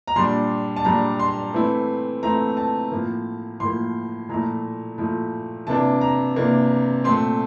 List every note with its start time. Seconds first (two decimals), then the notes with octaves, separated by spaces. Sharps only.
0.08 A#5
0.16 A#2 G3 D4 C6
0.76 A5
0.85 A#2 G3 D4 A#5
1.19 C6
1.54 E3 A3 C4 E4
2.23 E3 A3 C4 E4 A#5
2.57 A5
2.92 A2 F3 A#3
3.60 A2 F3 A#3 C6
4.29 A#2 F3 A3 E4 A#5
4.98 A#2 F3 A3 E4
5.67 C3 E3 A#3 D4 A5
6.01 A#5
6.36 C3 E3 A#3 D4
7.04 A#2 A3 C4 C6